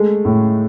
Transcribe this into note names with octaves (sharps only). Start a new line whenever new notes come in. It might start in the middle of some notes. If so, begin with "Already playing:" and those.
Already playing: G#3 A3
A2